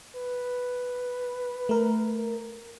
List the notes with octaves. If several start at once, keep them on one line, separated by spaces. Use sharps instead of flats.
B4
A3 A#4